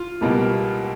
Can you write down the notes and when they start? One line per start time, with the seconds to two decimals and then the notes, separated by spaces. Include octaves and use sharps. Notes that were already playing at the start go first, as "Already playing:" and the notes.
Already playing: F4
0.21 C#2 B2 G3 A#3